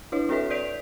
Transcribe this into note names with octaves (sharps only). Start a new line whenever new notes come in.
D4 E4 B4 C#5
C4 F#4 A4 B4 E5 B6
B4 D5 G6 B6 D7 F7